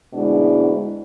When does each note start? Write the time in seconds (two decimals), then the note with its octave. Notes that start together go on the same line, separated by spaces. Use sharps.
0.13 D2 G#2 B2 G#3 D4 E4